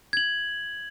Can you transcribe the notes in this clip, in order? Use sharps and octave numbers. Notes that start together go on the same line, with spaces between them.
G#6 F#7